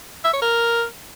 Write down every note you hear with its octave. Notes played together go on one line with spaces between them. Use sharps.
E5
C#5
A#4